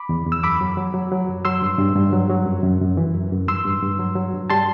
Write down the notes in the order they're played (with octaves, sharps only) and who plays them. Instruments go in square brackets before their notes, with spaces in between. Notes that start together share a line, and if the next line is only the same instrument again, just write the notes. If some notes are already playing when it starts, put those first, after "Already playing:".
Already playing: [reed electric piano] B5 D6
E2
E2
E6
F#2 B5 D6
F#3
F#3
F#3
F#3
F#2
F#3 C6 E6
G2
G2
G2
F#3
F#3
F#2
F#2
F#2
E3
F#2
F#2
G2 C6 E6
G2
G2
F#3
F#3
G2
G3 A5 C6